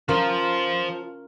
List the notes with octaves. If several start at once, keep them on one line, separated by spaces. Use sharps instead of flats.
F3 C#4 F4 A#4 C5 F5